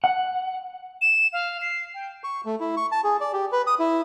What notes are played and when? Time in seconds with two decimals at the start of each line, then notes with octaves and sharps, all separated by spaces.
0.04 F#5
1.01 E7
1.33 F5
1.61 C7
1.94 G5
2.24 C#6
2.45 A3
2.60 E4
2.77 C#6
2.92 A5
3.04 G#4
3.21 D5
3.33 G4
3.52 B4
3.67 D#6
3.79 E4